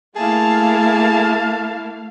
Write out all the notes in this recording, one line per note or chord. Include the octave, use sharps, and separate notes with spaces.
A3 A#3 E4 G#4 F5 A5